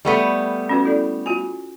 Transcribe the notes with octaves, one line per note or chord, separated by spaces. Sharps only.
G3 A3 B3
C#4 F#4 B4
E4 A4 D5
F4 F#4 G#5